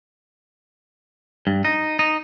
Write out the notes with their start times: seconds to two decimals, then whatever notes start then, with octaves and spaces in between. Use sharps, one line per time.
1.47 G2
1.65 D#4
1.99 D#4